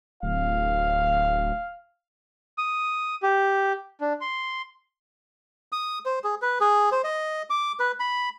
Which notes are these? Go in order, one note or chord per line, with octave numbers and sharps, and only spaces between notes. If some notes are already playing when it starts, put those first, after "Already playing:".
D1 F5
D#6
G4
D4
C6
D#6
C5
G#4
B4
G#4
C5
D#5
D6
B4
B5